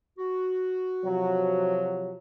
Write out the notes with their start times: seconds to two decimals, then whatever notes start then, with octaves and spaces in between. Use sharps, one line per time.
0.18 F#4
1.04 C3 F3 F#3